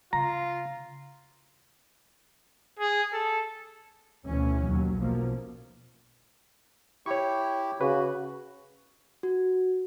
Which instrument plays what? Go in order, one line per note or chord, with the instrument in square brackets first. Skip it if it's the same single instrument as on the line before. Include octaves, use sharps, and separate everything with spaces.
[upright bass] C#3 [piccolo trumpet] F4 [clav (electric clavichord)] A#5
[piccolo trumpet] G#4
A4
[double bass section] D2 B2 E3 C#4
D#2 F#3
B1 B2 F3 A#3
[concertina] E4 G4 [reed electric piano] C#5 C#6
[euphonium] C#3 [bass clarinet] F#4 [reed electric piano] B4
[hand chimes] F#4